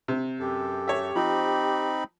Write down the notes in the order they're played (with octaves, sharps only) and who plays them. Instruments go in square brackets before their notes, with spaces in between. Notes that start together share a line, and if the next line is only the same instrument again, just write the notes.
[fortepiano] C3
[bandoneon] F#2 A4 [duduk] G4
[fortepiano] C#5 E5
[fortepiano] F3 [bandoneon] C4 D#4 B5